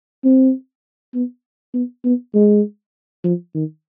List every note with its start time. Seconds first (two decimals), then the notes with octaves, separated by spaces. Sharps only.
0.24 C4
1.15 B3
1.74 B3
2.05 B3
2.34 G#3
3.24 F3
3.55 D#3